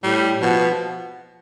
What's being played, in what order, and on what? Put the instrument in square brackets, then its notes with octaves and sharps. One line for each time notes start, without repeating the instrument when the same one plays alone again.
[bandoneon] A2 [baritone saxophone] G3
[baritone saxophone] B2 [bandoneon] F3 B3